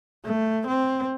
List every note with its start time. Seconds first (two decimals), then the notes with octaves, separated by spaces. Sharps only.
0.25 A3
0.67 C4